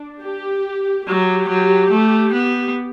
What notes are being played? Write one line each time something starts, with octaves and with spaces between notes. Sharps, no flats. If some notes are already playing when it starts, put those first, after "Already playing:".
Already playing: D4
G4
F#3 G4
F#3
A3
B3